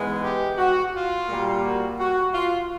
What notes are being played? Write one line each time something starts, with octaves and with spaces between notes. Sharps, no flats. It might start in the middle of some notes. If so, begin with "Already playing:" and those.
Already playing: G#2 E3 G#3 B3
G4
F#4
F4
A#2 G3 A#3
F#4
F#4
F4